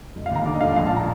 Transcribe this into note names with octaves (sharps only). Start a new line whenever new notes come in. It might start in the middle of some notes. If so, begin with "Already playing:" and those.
F1
F5
D#2 A#5
D3 D6
D#5
F1 F5
A#1 F5
A5
A#2 A#5